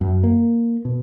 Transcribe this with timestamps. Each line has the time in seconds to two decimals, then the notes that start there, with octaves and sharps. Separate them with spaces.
0.01 F#2
0.24 A#3
0.85 B2